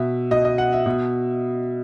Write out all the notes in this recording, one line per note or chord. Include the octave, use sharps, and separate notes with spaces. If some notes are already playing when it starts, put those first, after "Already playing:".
Already playing: B2 E5
B2 D#5
D#5
F#5
E5
B2